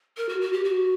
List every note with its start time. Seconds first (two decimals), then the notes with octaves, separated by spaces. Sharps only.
0.17 A#4
0.29 F#4
0.41 F#4
0.53 G4
0.64 F#4